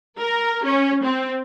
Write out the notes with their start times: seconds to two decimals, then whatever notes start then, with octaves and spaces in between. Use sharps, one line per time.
0.19 A#4
0.64 C#4
1.03 C4